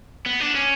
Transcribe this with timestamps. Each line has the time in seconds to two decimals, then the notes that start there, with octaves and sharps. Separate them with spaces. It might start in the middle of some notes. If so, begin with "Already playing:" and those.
0.26 B3
0.40 D4
0.55 C#4